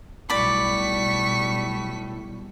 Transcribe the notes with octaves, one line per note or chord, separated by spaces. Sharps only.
B1 A2 G3 D5 B5 C#6 B6